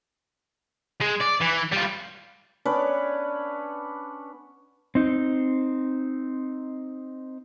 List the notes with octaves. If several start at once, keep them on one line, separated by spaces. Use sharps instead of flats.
G#3
D5
E3
G3 F4
B3 C#4 D4 B4
C4 D#4